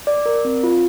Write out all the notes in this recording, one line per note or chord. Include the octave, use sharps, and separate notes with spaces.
D5
A#4
C4
F4